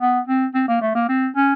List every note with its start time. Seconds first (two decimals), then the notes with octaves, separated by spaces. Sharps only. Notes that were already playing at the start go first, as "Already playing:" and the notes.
0.01 B3
0.27 C4
0.55 C4
0.68 A#3
0.82 A3
0.95 A#3
1.09 C4
1.36 C#4